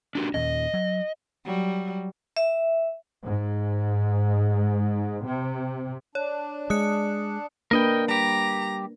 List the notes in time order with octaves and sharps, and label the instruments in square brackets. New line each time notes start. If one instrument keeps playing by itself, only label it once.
[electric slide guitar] D4 F#4 G4
[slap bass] D#2 A#2 C#4 [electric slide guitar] D#5
[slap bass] F#3
[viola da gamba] F#3 G3
[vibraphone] E5
[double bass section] G#2
C3
[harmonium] D4 [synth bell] C#5
[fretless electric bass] G#3 [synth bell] D#6 F#6 C#7
[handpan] A#3 D4 B4 [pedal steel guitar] A#4 D#5 G5
[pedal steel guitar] G3 G4 [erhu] A#5